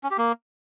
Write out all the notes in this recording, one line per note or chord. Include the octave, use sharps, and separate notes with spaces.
C#4
G4
A#3